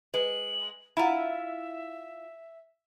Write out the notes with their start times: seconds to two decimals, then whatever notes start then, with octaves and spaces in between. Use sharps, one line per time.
0.14 G#3 B4 F#7
0.97 E4 F4 E5 F#5 A#5 B5